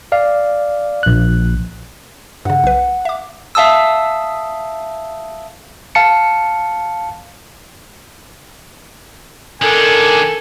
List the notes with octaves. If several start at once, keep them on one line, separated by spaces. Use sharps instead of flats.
D5 F5
A#1 F#6
G2 C#3 F#5
B1 B4
E5 D6
E5 F5 A5 D#6 E6
F5 A5 C#7
D#3 D4 A4 A#4 G#5